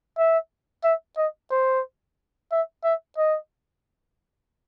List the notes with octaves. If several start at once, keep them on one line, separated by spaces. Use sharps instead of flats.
E5
E5
D#5
C5
E5
E5
D#5